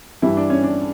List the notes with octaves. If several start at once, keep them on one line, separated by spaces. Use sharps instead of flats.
G2 E3 G3 E4
D4
C#4
D4